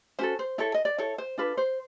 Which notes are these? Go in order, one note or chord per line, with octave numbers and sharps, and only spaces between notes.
C#4 F#4 A4 C5
C5
E4 A4 C#5
D#5
D5
E4 A4 C#5
C5
D4 F4 A4 B4
C5